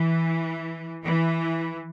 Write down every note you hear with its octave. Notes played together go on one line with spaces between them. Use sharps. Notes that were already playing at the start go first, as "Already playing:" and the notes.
Already playing: E3
E3